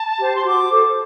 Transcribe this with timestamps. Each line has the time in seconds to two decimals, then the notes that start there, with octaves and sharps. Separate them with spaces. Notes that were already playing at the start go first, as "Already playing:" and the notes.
Already playing: A5
0.18 G4 C5
0.35 C6
0.43 F#4 D6
0.70 A4 C5